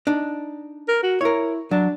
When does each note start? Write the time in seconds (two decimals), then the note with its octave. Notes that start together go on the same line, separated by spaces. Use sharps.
0.07 D4 D#4
0.88 A#4
1.03 F#4
1.21 E4 A#4 C#5
1.71 F#3 D4